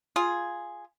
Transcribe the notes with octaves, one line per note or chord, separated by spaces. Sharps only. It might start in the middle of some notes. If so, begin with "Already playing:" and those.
F4 G#4